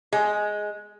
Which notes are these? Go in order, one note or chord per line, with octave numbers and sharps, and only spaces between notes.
G#3